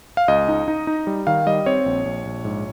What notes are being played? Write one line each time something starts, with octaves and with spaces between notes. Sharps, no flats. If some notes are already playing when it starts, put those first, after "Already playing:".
F5
C#2 D#5
D#4
D#4
D#4
G3
D#3 F5
G3 D#5
C4 C#5
A#1
A#1
A#1
G#2